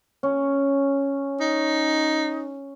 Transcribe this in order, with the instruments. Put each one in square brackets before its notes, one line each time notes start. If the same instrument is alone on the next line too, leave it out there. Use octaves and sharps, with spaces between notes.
[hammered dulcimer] C#4
[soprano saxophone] D#4